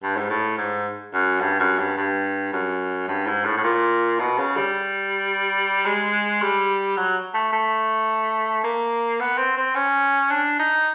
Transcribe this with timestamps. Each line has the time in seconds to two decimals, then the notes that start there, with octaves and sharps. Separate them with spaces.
0.03 G2
0.16 G#2
0.29 A2
0.58 G#2
1.14 F#2
1.41 G2
1.60 F#2
1.79 G2
1.97 G2
2.52 F#2
3.08 G2
3.27 G#2
3.45 A2
3.57 A2
3.64 A#2
4.20 B2
4.38 C#3
4.56 G3
5.85 G#3
6.42 G3
6.97 F#3
7.34 A3
7.53 A3
8.64 A#3
9.20 B3
9.38 C4
9.57 C4
9.75 C#4
10.30 D4
10.59 D#4